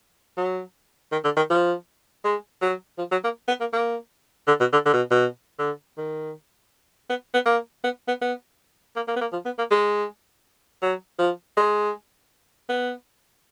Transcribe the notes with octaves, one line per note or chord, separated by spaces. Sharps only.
F#3
D#3
D3
D#3
F3
G#3
F#3
F3
F#3
A#3
B3
A#3
A#3
D3
B2
D3
D3
B2
B2
D3
D#3
B3
B3
A#3
B3
B3
B3
A#3
A#3
B3
A#3
F3
B3
A#3
G#3
F#3
F3
G#3
B3